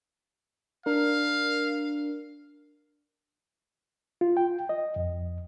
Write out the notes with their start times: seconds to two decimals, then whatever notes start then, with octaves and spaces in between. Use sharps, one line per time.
0.86 D4 A#4 F5
4.21 F4
4.37 G5
4.69 D#5
4.96 F2